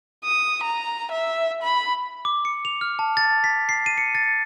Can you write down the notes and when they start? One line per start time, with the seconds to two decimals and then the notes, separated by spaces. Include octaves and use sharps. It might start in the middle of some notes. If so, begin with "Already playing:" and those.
0.24 D#6
0.63 A#5
1.12 E5
1.62 B5
2.25 D6
2.45 C#7
2.65 F7
2.81 F6
2.99 A5
3.17 A6
3.44 B6
3.69 C7
3.86 D#7
3.98 C#7
4.15 A6